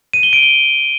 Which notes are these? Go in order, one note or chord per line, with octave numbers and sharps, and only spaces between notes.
D#7
G7
D7
G7